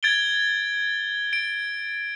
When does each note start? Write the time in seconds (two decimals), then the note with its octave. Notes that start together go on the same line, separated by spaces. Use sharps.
0.03 G#6 A6 D7 G7
1.33 D7